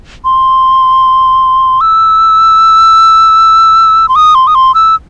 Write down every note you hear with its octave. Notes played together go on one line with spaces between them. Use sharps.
C6
E6
C6
D#6
C6
D#6
C6
E6